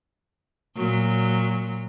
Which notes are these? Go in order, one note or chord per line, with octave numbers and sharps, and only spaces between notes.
A#2 F#3